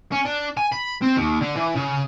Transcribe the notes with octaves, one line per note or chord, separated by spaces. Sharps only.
C#4
D4
G#5
B5
C4
D#2
D3
E3
C#3